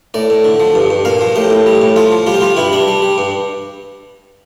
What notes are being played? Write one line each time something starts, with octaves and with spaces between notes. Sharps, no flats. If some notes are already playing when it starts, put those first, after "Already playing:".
A2 D5
A2
D3
F3
G2
G2
A#2 F5
F3
A2 G4
A2
G3
A2
F3 F4
F3
G3 F4
G4
G3 F4
G2 E4
G3 D4
G3
G3
G2